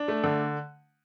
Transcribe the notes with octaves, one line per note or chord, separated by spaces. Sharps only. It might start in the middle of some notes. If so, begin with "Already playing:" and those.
Already playing: D4
A3
D3